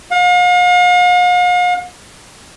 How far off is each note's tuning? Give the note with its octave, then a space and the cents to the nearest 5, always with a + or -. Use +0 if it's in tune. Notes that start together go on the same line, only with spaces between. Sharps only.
F5 +45